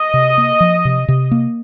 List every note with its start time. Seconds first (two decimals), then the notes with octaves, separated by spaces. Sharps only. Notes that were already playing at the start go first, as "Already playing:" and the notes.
Already playing: D#5
0.14 C3
0.38 A#3
0.60 F3
0.85 C3
1.08 C3
1.31 A#3